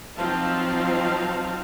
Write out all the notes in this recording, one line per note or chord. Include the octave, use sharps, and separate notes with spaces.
F3 F#3 C4 D#4 F5 A5